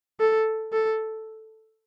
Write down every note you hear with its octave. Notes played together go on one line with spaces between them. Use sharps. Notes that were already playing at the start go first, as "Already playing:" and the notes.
A4
A4